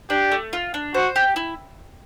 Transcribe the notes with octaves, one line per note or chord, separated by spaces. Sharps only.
D4 G4
A3
F4
D4
F#4 C5
G4
E4